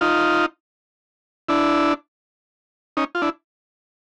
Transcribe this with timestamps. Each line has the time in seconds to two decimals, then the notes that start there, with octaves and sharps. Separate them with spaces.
0.01 D#4 F4
1.49 D4 E4
2.97 C#4 D#4
3.15 F4
3.22 D4 E4